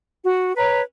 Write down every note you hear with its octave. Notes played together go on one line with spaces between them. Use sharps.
F#4
B4 C#5 A#5